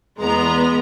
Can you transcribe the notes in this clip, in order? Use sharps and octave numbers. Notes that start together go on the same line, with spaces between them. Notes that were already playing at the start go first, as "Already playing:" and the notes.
E2 G#3 B3 A#5